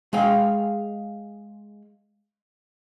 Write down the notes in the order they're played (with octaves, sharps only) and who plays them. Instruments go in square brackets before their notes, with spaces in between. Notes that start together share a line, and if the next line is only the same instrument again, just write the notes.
[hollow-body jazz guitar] G#3 G#4 F5 G5